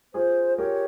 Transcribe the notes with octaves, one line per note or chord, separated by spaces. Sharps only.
F4 G#4 C5
G4 A#4 C#5